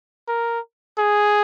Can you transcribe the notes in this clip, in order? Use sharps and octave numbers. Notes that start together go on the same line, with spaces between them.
A#4
G#4